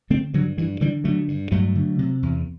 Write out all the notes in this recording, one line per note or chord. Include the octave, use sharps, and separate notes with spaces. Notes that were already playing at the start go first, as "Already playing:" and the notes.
D3 A3 C4
G2 D3 F#3
G2 E3
D3 E3 G3
D3 F#3 A3
G2
G2 F#3 A3
D3
C3
E2